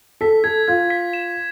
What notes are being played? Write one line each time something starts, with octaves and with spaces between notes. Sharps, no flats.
A4 B6
A4 G#6
F4 G#6
B6
E7